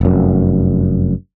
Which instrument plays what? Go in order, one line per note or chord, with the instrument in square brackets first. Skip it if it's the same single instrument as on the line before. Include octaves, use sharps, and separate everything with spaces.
[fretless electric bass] F1 F#2